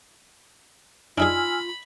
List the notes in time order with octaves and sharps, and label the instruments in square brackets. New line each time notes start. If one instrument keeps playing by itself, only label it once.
[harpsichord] D4 D#4 G#4 [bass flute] F4 [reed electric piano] G#5 E6 F6 [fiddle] B5